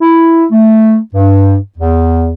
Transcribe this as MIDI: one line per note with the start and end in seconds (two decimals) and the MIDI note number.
0.01 0.45 64
0.52 0.98 57
1.15 1.57 43
1.78 2.34 40